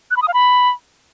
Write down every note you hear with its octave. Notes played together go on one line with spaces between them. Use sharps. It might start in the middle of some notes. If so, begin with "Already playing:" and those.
F#6
B5
D#6
F5
B5